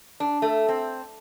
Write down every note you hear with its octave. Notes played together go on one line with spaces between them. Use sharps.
D4
A3
C4